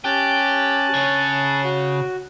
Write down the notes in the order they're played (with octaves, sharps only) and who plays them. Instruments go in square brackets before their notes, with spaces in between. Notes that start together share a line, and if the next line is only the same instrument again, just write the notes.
[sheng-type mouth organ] C#4 A5 F#6 [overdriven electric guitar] G4
[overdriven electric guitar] C#3 C#5
[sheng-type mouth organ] F#4